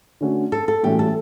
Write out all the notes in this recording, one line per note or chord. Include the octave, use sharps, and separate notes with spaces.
D3 A3 C#4 F#4
A4
A4
A2 E3 G3 C#4 F#4 G4
A4